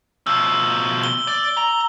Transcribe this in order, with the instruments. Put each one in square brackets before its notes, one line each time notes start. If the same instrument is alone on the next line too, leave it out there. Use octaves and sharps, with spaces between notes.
[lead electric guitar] B2 F3 [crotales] E6
[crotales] G7
[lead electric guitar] D5
A#5